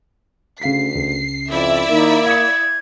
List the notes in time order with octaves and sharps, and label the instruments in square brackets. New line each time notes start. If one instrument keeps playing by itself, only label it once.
[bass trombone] D2 [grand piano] C#3 F5 B6 [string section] C7
[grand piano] C#2
[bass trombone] F2 [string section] E4 D5 E5
[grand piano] D#3 [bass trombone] A#3 [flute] D#4
[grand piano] F5 D#6 C#7 [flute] G#6